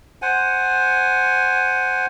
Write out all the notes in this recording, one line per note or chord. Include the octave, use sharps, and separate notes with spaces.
C5 F#5 G#5